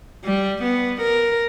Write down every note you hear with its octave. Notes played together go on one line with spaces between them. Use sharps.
G3
B3
A#4